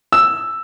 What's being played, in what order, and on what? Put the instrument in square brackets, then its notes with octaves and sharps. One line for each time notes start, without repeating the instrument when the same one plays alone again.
[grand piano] E6